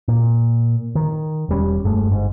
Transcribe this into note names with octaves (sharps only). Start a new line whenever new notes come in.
A#2
D#3
E1 G3 C#4
F1 G2 G#3 A3
G1 G#2